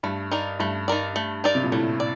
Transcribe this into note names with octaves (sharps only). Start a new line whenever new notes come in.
G2 A3
D#4 A#4 D5
G2 A3
D#4 A#4 D5
A3
D#4 A#4 D5
C3
A#2
A2 A3
D5